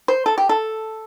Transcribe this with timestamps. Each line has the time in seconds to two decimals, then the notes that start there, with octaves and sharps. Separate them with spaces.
0.08 C5
0.26 A4
0.38 G4
0.49 A4